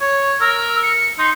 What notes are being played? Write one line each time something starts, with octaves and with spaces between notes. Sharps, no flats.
C#5
A#4 E6
C#7
D#4 C6